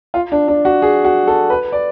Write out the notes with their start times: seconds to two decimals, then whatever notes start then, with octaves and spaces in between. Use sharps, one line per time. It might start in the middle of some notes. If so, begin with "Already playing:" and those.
0.14 F4
0.32 D4
0.48 D4
0.65 F#4
0.82 G#4
1.04 F#4
1.27 A4
1.50 B4
1.72 D5